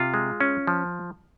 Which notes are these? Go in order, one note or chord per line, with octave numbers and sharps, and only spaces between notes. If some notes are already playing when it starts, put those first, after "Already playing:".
Already playing: C3 F4
G#3
C#4
F3